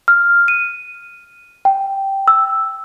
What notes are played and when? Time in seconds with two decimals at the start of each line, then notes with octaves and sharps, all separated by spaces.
0.08 F6
0.48 D#7
1.65 G5
2.28 E6